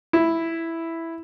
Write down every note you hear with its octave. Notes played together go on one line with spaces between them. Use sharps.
E4